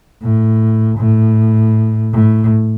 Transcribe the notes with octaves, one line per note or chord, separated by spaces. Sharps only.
A2
A2
A2